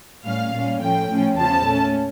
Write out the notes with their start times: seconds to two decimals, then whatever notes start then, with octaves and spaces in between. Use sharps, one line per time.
0.25 A2 G3 C#4 F5
0.53 A#2 G3 A#3 C#4
0.80 A2 F3 A3 C#4 G5
1.09 A2 F3 C#4
1.37 E2 C#3 F3 C#4 A5
1.65 A#2 A3 C#4